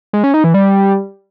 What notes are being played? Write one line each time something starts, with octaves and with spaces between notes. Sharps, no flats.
G#3
C#4
D#4
E3
G3